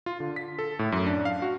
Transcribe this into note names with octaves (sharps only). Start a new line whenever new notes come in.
F4
D3
B6
A4
A2
F#2
D4
F5
F#4